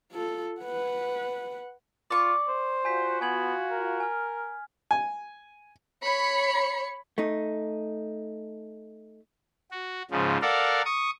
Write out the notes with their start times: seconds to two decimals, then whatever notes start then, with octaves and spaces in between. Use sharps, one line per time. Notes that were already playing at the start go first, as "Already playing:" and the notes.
0.12 F4 A4
0.61 B4 F#5
2.10 F4 D5 C#6
2.48 C5
2.85 F4 F#4 G#5 G6 B6
3.21 B3 G#5 G#6 F#7
3.71 A#4
4.00 G#5 F6
4.91 G#5
6.04 C#5 B5 C#7
7.18 A3 D#4
9.71 F#4
10.11 G#2 C#3 F3
10.42 A4 A#4 D5 F5 F#5
10.85 C#6 D#6